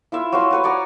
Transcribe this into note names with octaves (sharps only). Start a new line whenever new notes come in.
E4 F4 E5
F#3 F5 C6
F#4 B4 C#5
C#5 D5 F#5 A#5